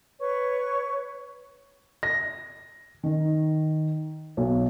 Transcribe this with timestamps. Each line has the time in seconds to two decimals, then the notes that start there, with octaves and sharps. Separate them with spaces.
0.19 B4 C#5 C#6
2.03 A#6
3.03 D#3
4.37 B1